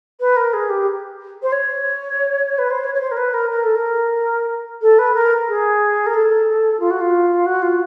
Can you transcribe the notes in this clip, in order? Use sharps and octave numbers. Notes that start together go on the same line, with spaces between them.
B4
A#4
G#4
G4
C5
C#5
B4
C5
C#5
C#5
C5
A#4
B4
A#4
A#4
A4
A#4
A4
B4
A#4
G#4
A#4
A4
F4
F#4
F4
F#4
F4